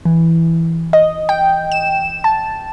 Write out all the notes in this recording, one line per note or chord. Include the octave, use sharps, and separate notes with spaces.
E3
D#5
G5
E7
A5